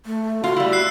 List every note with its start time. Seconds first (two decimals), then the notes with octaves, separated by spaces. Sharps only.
0.06 A3
0.44 F4 F#4 F5
0.56 G3 E4
0.72 E6 F#6 C7